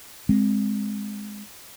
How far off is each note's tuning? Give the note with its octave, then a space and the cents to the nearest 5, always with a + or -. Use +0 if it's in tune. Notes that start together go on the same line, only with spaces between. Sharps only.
G#3 +0 C4 +0